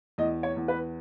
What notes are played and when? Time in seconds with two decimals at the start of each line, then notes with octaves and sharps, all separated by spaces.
0.18 E2 D#5
0.43 C#5
0.57 E2
0.68 B4